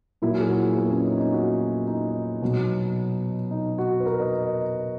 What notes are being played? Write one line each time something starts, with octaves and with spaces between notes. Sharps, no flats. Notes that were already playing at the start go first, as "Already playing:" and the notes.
A#2 F#3 E4
G#4
F#4
B3
C#4
D#4
D#4
F#4
D#4
B2 F#3
D#4
F#4
B4
A#4
D#5